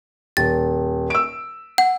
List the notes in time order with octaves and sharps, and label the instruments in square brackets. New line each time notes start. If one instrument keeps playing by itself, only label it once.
[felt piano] D#1 [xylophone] A6
[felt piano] E6 D7
[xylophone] F#5